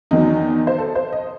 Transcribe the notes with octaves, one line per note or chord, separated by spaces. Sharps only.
E2 D#3 F#3 D#4
C5
A4
C5
D#5